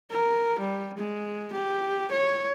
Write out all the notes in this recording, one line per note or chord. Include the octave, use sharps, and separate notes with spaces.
A#4
G3
G#3
G4
C#5